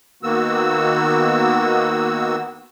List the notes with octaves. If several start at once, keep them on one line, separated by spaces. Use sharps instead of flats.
D#3 A#3 B3 F#4 E6